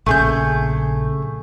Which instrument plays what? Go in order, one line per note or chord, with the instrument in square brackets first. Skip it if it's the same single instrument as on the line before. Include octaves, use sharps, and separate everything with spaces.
[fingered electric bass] A#1 C#3 [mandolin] A3 G#4 G6